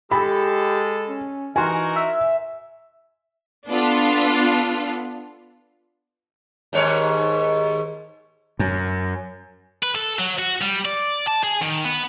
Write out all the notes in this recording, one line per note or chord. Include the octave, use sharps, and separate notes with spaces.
G#3 G4 A4 B5
C#4
E3 D#4 F#4 A#4 G#5 C6
E5
B3 D4 F4 A4
D#2 G#2 C#5
F#2
B4
A4
F#3
F#4
G3
D5
A5
G#4
D#3
B3